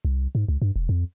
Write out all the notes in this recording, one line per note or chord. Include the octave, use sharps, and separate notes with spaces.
C2
G#2
C#2
G2
E1
F2